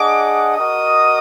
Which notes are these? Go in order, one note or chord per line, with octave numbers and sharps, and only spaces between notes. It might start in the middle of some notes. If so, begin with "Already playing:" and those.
Already playing: D4 G#4 D#5 F#5 D6
F#4 A#4 D#5 D#6